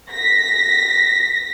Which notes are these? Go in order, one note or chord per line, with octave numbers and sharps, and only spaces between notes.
A#6 B6